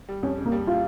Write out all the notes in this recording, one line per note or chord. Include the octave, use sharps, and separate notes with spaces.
G3
F2 C#4
C#3
A#3
G3
F4